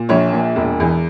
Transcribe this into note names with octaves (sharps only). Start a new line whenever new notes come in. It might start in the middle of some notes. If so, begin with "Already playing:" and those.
Already playing: A#2
A#1 C#5
A#2
E1
E2